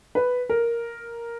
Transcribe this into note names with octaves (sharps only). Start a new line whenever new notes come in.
B4
A#4